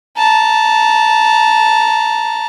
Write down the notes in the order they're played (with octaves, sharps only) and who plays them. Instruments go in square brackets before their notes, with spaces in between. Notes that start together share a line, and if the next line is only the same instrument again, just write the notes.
[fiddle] A5 A#5